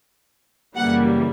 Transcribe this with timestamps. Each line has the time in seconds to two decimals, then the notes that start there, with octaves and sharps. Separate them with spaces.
0.76 F#2 C#3 E3 G3 A#3 F#5